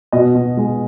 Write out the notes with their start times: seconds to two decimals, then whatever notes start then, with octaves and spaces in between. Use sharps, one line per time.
0.12 B2 D#5
0.35 B2
0.57 G#3